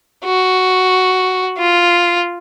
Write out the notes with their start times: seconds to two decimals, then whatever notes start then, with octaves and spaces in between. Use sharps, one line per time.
0.25 F#4
1.58 F4